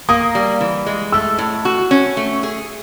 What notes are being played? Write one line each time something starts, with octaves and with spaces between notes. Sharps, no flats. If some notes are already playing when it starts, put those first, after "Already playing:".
A#3 D#6
G3
E3
G#3
A3 E6
A2
F#4
C#4
A3
G#4